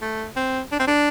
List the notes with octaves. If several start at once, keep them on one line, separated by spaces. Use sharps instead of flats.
A3
C4
D4
C4
D4